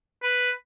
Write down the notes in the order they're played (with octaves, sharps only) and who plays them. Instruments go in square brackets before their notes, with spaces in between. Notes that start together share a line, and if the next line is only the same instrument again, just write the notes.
[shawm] B4